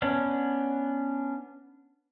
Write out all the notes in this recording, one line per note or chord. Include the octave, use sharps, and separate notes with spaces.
B3 C#4 D4